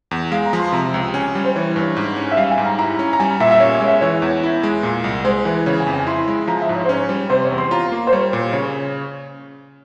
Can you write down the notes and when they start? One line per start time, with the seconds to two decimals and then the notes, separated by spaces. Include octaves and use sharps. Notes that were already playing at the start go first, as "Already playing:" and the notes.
0.11 E2
0.31 G#3 F5
0.45 A#5
0.53 F3
0.60 C6
0.72 C3 A#5
0.94 C#2
1.14 C#4 G#5
1.35 G3
1.44 C5
1.55 E3 C#5
1.76 G2
1.97 G#2
2.16 C#4
2.31 E5
2.37 G3 F5
2.51 G#5
2.58 G#2
2.65 A#5
2.78 E4 A#5
2.99 C#4
3.13 A#5
3.20 G3 G#5
3.40 A#2 E5
3.51 E5
3.60 C#4 C#5
3.74 C#5
3.81 G#3
3.88 E5
4.01 E3 C#5
4.22 E2
4.43 E4
4.63 G#3
4.83 A#2
5.04 C2
5.24 G#3 C5
5.45 E3
5.66 C#3 C#5
5.80 G#5
5.87 F2
5.94 G#5
6.07 E4 C6
6.28 G#3
6.47 F3 A#5
6.61 E5
6.69 G#2
6.76 C#5
6.84 C5
6.89 C#4 C#5
7.09 G3
7.30 C3 C5
7.44 C#5
7.51 E2
7.58 C6
7.71 F4 A#5
7.92 A#3
8.07 C5
8.12 G3 C#5
8.33 A#2
8.53 C#3 C#5